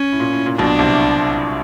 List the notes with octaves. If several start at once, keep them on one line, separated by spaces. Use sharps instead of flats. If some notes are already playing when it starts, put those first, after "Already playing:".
Already playing: C#4
A2
A#2
A2
A#2
B1 B2 D4
C2 C3